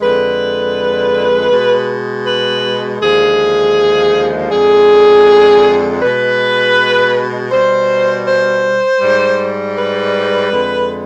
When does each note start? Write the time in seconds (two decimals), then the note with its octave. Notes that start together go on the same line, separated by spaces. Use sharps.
0.01 F2 D3 G#3 B4
1.51 B2 G#3
2.26 B4
3.01 D#2 D3 F3 G#3 G#4
4.51 F2 D3 G#3 G#4
6.01 B2 G#3 B4
7.51 B2 G3 C5
8.26 C5
9.00 G#2 G3
9.76 B4
10.51 F2 D3 G#3